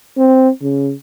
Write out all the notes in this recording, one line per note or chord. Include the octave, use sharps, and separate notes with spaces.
C4
C#3